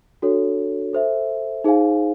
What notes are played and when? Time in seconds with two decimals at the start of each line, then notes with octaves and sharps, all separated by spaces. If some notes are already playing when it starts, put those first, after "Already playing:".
0.22 D4 F#4 A4 C#5
0.93 A4 C5 E5
1.64 D#4 G#4 C5 F5 G#5